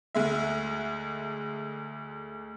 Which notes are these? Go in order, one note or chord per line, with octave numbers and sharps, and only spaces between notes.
D2 G#3 E5